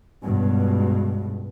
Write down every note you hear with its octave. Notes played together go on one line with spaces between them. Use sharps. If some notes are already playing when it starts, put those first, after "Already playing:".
C#2 G2 B2